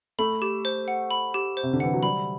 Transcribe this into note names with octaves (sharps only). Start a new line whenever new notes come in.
A3 B5
G4
C5
F#5
B5
G4
C5
C3
D3
E3 F#5
F#3
G3 B5